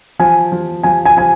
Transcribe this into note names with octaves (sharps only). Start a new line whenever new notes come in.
F3 G#5
F3
F3 G#5
G#5
F3 G#5